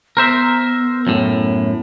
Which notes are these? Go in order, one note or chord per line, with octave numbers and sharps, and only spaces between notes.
B3 A#4 C5 E5
F#2 A2